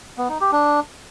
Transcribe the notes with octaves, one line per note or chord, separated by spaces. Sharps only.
B3
D#4
G4
D4